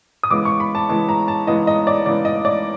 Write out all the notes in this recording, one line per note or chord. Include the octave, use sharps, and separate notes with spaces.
D#6
C#3 E3 G#3 B3 D6
C#6
B5
A5
C#3 E3 G#3 B3 A5
A#5
A5
C#3 E3 G#3 B3 D#5
D#5
D5
C#3 E3 G#3 B3 D5
D#5
D5